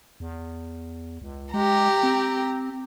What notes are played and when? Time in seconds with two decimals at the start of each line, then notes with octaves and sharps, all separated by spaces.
0.20 E2
1.22 C#2
1.54 G#3 G4 A#5
2.03 C4